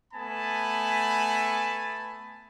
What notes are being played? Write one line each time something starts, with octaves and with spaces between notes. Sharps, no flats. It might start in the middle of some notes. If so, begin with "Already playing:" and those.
A3 B3 G#5 A5 B5